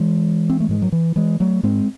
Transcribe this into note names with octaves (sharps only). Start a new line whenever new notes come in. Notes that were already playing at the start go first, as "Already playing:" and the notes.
Already playing: E3 G#3
C4
A3
G#2 G#3
F#3
E3
E3 G#3
F#3 A3
G#2 G#3 C4